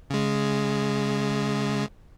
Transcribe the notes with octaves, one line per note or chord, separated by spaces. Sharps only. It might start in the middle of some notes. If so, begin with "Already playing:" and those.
C#3 G#3